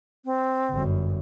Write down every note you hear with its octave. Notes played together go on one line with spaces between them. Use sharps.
C4
G1 F#2